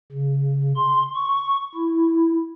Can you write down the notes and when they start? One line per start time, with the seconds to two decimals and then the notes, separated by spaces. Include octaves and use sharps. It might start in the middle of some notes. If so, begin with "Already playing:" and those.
0.12 C#3
0.76 C6
1.15 C#6
1.75 E4